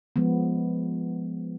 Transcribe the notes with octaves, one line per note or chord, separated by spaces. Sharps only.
F3 G#3 B3